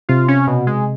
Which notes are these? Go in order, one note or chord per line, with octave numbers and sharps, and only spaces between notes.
C3 F4
C#4
B2
G#3